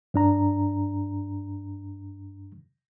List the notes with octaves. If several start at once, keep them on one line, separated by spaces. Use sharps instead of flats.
G2 D4 A#5